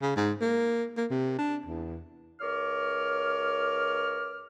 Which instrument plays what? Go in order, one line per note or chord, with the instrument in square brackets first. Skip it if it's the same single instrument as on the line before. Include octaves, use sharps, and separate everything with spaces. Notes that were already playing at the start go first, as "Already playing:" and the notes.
[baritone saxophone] C#3
G#2
A#3
A#3
C3
D4
E2
[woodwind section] C#2 A#4 C#5 D6 F6